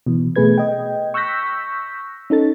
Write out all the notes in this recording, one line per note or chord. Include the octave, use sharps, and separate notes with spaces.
B2 E3
B2 A3 G#4 B4 G#6
D#5 G5
C#6 E6 F#6 G6 A#6 B6
C#4 D#4 A4 A6